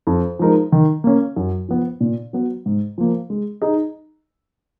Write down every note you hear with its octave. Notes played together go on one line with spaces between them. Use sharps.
F2
F3 G#3 D#4 A#4
D#3
A#3 C#4
F#2
F3 B3
A#2
F#3 B3
G#2
F3 A#3
G#3
D#4 G#4 D#5